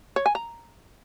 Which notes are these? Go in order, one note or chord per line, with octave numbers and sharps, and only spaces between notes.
C#5
G#5
A#5